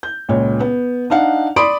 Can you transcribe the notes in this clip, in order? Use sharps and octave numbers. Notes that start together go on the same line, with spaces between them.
G6
C#2 A#2 C#5
B3
D4 D#4 F5 F#5
D5 B5 C6 D6 D#6 D7